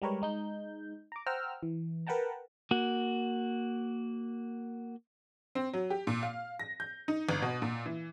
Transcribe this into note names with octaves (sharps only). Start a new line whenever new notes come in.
G3 G#3 G4 A#4 B4 C#5
G#3 D#4 G6
A#5 D6
C5 F#5 G5 A#5 E6 F6
E3
A#4 B4 F#5 G5 A5 A#5
A#3 F#4
C4
F#3
G4
A#2
F5
A#6
G6
D#4
G1
B2
A#2
E3